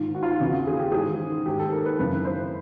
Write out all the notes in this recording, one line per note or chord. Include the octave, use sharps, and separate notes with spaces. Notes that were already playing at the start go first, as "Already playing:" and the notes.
Already playing: G#2 D#3 F4
F#4
F4
F#4
E2 C#3 E3
G#4
G4
G#2 D#3 G#4
G#2 D#3 G4
A4
A#4
B4
F#2 C#3 E3 B4
C5